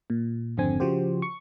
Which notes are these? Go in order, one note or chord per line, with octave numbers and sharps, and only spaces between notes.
A#2
G#1 F2 D3 C4 G#5
C#3 F3 F#4 G4 C5
C#6